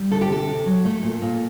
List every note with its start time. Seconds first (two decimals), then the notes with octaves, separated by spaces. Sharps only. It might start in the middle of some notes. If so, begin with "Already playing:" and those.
Already playing: G3
0.11 D3 A4
0.21 G4
0.30 C3 A4
0.48 C3
0.66 F#3
0.85 A3
1.03 A#2
1.22 A#2